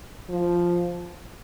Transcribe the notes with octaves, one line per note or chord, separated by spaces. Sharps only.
F3